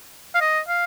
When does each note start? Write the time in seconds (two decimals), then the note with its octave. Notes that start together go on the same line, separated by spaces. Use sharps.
0.35 F5
0.41 D#5
0.68 F5